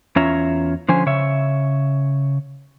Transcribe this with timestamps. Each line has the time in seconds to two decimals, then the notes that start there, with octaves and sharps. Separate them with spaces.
0.16 E2 C#4 F4 C#5 E5 A#5
0.89 D3 F3 C#4 C5 G#5
1.06 C#3 C#5 E5